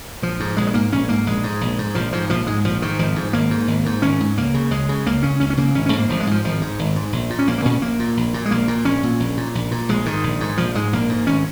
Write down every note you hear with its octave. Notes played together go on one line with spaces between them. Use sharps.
A#1 F3
G#2
A#1 G#3
G#3
G#2 A#3
A#1 C#4
G#2 A#3
A#1 G#3
G#2
A#1
G#2
A#1 F3
G#2 F3
A#1 F3
G#2 G#3
A#1 F3
G#2 D#3
G#1 F3
G#2
G#1 A#3
G#2
G#1
G#2
G#1 C#4
G#2
C#2 A#3
C#3
C#2 G#3
C#3
C#2 A#3
C#3 C#4
C#2 C#4
C#4
C#3 A#3
G#1 C#4
C#4
G#2
A#3
G#1 F3
G#3
G#2 F3
G#1 F3
G#2
G#1
G#2
A#1
A#2
C#4
A#1 A#3
A#3
A#2 C#4
A#1 A#3
A#2
A#1
A#2
G#3
A#1 A#3
A#2
A#1 C#4
A#2
A#1
A#2
A#1
A#2
A#1 G#3
G#2 D#3
A#1
G#2
A#1 F3
G#2 G#3
A#1 A#3
G#2
G#1 C#4